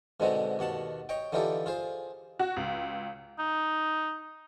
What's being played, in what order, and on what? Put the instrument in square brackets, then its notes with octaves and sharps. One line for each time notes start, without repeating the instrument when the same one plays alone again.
[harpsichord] G#2 B2 D3 G#3 C4 F#4
D#2 B2 F#5 A5
C#5 D#5 G5
D3 E3 D#4 F4 G4 A4
F4 G#4 C5
[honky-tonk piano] F#4
C#2
[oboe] D#4